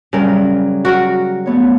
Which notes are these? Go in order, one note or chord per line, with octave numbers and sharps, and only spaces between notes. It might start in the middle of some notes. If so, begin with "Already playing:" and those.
C#3 F#3 G3 A#4
F#4 A#4
A3 B3 C#5